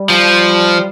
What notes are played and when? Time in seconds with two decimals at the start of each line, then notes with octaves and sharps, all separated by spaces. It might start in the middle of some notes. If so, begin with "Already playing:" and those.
Already playing: G3
0.10 F3